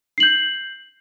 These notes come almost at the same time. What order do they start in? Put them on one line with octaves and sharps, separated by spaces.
C7 F#7 G6